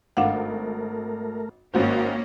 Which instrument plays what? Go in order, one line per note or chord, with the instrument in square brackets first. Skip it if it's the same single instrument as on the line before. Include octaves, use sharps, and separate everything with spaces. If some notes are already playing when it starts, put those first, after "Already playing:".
[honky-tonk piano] G#1 [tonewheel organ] A3 A#4 [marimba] D4 F5 F#5
[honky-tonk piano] G#1 F#4 C5 [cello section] A#3 C#4 [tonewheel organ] F5 G5